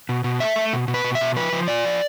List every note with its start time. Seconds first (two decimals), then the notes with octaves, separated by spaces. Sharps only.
0.09 B2
0.24 B2
0.40 A3 E5
0.56 A3
0.73 B2
0.88 B2
0.94 B4
1.04 B2
1.15 E5
1.21 B2
1.36 F3 B4
1.53 F3
1.68 F4 D5
1.85 F3